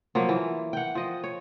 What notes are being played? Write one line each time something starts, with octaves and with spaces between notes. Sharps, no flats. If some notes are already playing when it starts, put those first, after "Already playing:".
F3 F#3 A#3
E3
F#5 G5
F3 D#5
C#5